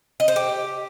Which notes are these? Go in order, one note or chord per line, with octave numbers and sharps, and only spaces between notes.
D#5
C5
G4